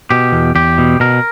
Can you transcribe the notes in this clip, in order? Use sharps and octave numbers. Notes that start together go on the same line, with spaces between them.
B2 G4
E2
E2 G4
B2
B2 A#4